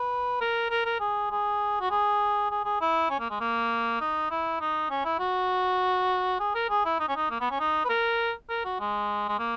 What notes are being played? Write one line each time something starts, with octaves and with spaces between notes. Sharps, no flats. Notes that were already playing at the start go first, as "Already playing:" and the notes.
Already playing: B4
A#4
A#4
A#4
G#4
G#4
F#4
G#4
G#4
G#4
E4
C#4
A#3
G#3
A#3
D#4
E4
D#4
C#4
E4
F#4
G#4
A#4
G#4
E4
D#4
C#4
D#4
A#3
B3
C#4
D#4
B4
A#4
A#4
F#4
G#3
G#3
A#3